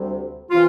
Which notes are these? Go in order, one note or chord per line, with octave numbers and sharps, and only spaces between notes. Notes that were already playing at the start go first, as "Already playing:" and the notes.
Already playing: D2 C3 G3
C3 E3 F4